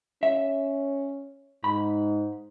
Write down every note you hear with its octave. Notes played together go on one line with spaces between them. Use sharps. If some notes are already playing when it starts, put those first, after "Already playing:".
C#4 E5
G#2 B5